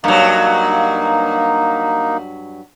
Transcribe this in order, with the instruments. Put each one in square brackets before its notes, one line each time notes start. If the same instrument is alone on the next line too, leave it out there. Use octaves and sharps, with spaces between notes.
[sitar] G2 F#3 [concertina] A#3 D#4